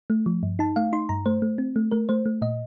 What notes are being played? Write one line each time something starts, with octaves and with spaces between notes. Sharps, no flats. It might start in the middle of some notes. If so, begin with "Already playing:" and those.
A3
F3
G2
D#4 A5
A3 F5
D#4 C6
G2 A#5
A3 C5
A3
C4
A3
A3 A#4
A3 C5
A3
A#2 D#5